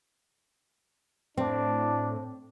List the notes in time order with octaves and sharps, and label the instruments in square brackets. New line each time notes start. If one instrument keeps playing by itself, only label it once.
[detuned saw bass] A2 [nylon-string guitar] C4 [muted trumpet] D4